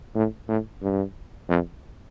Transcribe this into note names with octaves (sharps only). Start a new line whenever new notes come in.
A2
A2
G2
F2